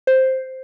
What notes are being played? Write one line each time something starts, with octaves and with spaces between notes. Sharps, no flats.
C5